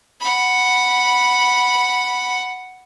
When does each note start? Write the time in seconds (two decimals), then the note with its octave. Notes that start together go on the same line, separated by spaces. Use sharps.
0.21 F#5 B5